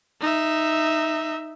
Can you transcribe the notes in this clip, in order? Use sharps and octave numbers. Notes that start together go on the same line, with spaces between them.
D#4 E5